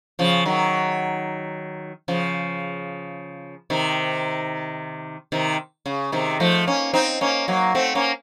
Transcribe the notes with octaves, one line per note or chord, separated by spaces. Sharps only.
C#3 F3
D#3 F#3
C#3 F3
C3 D#3
C3 D#3
C#3
C3 D#3
F3 A3
A#3 C#4
C4 D#4
A#3 C#4
F#3 A#3
A3 C4
A#3 C#4